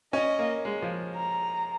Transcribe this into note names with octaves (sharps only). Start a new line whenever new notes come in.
C#4 D#5
A#3
G#3
F3
A#5